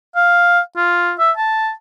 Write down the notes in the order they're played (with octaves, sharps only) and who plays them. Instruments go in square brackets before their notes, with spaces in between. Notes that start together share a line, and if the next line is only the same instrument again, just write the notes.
[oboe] F5
F4
E5
A5